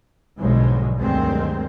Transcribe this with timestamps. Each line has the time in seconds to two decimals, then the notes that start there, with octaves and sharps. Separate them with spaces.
0.39 B1 G#2 D3 F3 F#3 G#3
0.98 D2 G2 D#3 F#3 G#3 C4